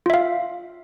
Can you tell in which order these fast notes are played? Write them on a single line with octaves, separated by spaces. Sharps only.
F4 E5 F5